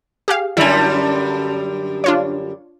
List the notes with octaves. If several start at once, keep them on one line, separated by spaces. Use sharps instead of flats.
G4 G#4 F5
F#2 D3 G3 E4 G#5
D4 F4 C#5